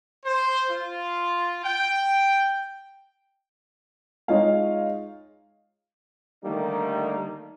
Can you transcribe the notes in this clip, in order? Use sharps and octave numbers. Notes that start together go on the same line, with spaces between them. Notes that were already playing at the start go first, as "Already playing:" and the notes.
C5
F4
G5
G#3 D#4 F4 C#5 F5
D3 D#3 G3 A3 A#3 D#4